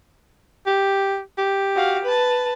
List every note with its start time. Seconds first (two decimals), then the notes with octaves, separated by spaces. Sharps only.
0.66 G4
1.38 G4
1.75 F#4 F5
2.04 B4 A5